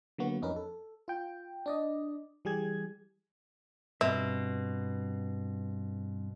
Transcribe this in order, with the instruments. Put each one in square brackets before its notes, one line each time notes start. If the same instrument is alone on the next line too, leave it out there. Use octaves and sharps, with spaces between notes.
[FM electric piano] D3 F#3 A#3 B3 F#4
F2 C#4 D#4 A#4 B4
A4
F4 G5
D4 D5 D#5
E3 G3 G4 G#4 G#6
[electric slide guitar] G2 C4 [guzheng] B2 [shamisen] E5